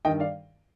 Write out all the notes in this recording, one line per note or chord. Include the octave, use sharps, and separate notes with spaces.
G2 D#3 D#5 G5
D5 F5